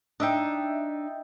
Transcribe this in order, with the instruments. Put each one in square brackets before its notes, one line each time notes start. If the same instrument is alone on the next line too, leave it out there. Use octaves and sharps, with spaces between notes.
[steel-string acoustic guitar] D4 D#4 [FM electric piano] D#5 E5 G5